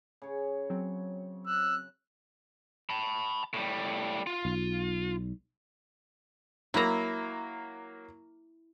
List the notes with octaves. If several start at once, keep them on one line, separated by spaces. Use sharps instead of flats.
C#3 C#5
F#3 C4
E6 F#6
A5 B5
A2 G3
F4
B1
F#3 A#3 E4 A#5